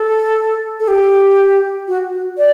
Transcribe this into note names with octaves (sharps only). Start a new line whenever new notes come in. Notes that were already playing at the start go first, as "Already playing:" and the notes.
Already playing: A4
A4
G4
F#4
F#4
D5